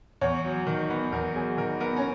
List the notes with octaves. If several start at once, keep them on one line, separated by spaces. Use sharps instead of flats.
E2 C#5
F#3
D#3
B3
E2 A#4
F#3 G#4
D#3 A#4
B3 A#4
C#4